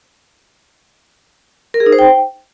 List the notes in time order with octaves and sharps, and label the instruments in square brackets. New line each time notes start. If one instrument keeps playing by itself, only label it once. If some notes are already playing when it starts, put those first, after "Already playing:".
[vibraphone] A#4
G#4
D#4
C5
G5